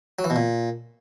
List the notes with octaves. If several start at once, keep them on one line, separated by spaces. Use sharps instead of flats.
F#3
E3
B2
A#2